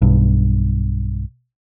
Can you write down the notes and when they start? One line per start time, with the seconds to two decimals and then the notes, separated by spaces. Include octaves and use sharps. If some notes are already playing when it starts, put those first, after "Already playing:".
0.02 B1 G2